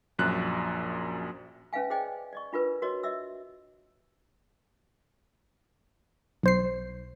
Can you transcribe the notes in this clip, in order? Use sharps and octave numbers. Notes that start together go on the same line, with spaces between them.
A#1 F#2 F#6
C#4 B4 E5 F5 G#5
G#4 C5 D5 D#5 G5 G#5
D5 D#5 C#6
D4 F4 A#4 B4
F#4 A#4 C#5 D#5
D#5 E5 E6
B1 C5 C7